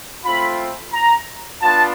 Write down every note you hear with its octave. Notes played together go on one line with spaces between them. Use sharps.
A3 C4 F4 B5
A#5
B3 D4 F4 A5